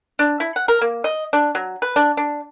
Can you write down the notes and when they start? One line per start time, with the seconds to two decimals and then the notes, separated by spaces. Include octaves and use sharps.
0.19 D4
0.40 E4
0.56 F#5
0.68 A#4
0.81 A#3
1.04 D#5
1.33 D4
1.55 F#3
1.82 B4
1.96 D4
2.17 D4